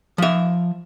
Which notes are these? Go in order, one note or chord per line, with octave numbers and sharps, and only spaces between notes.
F3 E5